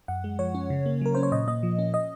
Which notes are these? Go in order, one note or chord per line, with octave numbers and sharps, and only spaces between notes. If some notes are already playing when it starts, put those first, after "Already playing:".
F#2 F#5
G#3
F3 C#5
C#4
C#3
A#3
F#3 A#4
C#4 C5
C#5
A#2 D#5
A#3 D#5
F3
C#4
D#5